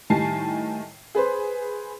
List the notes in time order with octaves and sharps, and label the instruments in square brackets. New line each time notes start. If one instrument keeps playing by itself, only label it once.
[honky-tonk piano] A2 D#3 G3 G#5 A5 C7
G#4 B4 C5